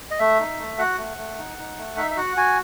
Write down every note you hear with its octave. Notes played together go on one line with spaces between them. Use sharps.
D#5
A3 E5
D#4
A3
F#4 F#5
A3
A3
D#4
D#4
A3
D#4 E5
E5
F#4 F#5
F#4 G#5